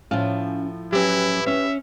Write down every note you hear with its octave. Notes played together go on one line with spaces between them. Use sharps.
A2 F3 C#4 F5
F#3 C#4 E4 G4 B4
C#4 E5